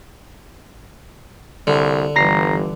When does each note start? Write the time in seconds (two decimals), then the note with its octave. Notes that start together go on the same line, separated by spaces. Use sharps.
1.67 C2 D3
2.16 G1 E3 G3 A#5 A#6 C7